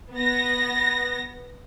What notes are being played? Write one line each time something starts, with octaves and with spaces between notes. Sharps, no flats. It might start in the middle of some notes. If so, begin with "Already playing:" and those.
B3 A#6